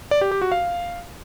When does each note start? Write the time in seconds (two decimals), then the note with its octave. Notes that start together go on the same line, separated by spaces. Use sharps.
0.11 D5
0.21 G4
0.31 G4
0.41 F#4
0.52 F5